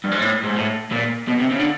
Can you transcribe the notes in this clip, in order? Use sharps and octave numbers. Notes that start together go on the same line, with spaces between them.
G2
G#2
A2
G#2
A2
A#2
B2
C3
C#3
D3